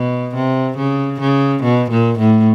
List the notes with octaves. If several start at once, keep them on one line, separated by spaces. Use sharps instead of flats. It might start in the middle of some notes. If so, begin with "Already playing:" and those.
Already playing: B2
C3
C#3
C#3
B2
A#2
A2